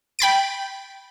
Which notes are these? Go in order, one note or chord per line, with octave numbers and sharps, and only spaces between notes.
G5 B5 A6 D7